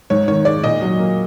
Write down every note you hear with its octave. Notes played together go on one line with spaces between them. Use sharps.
G#2 C#5
D#3 C#5
G#3 D5
A#2 D#5
F#3
A#3